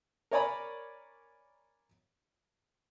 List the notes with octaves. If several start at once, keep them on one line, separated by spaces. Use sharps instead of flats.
A#4 C#5 D5 G#5 A#5 B5